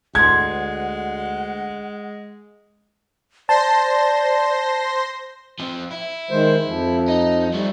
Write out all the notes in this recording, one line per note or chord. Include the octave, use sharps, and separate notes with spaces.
D2 G#3 F#5 C6 G#6
C5 D5 A5 C6 A#6
F3 C4
E4
D#3 G#3 C5
F2 F3
D#4
F3 G3 A3